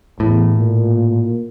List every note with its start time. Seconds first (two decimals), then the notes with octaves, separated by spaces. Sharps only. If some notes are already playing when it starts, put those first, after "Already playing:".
0.20 E2 A2
0.52 A#2